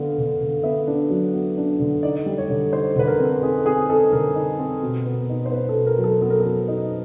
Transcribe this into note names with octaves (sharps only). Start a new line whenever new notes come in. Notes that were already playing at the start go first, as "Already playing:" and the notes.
Already playing: D3 B3 D4 F5
D3
D3
B3 E5
D4
F#3
B3
D4
D3
D#4 D5
G3
C#5
D3
D#4 C5
D3 B4
A#4
C4
A4
D#4 G#4
C4 G#4
D#4 A4
D3 A#4
D#4
C4
B2
B3
D#4
C5
B3 B4
A4
B2
A#4
F#3
A4
B3 A4
A#4
A4
F#3
D#4